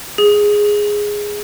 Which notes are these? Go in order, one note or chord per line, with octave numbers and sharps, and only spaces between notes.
G#4